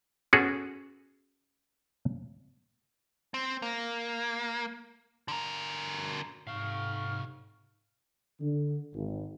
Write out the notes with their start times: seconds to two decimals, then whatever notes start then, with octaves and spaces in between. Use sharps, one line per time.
0.33 B3 C#4 F#4 G#4 A4
3.34 C4
3.62 A#3
5.28 D3 A#4
6.47 G#2 C3 F5 C#6 F6
8.40 D3
8.94 G#1